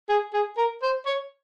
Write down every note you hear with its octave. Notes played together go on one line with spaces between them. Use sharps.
G#4
G#4
A#4
C5
C#5